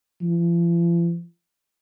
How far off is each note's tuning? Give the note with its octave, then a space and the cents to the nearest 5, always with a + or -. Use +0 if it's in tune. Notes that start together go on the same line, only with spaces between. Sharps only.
F3 -45